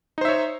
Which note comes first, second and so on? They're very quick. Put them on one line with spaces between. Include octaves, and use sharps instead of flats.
D#4 C5 E5 C#5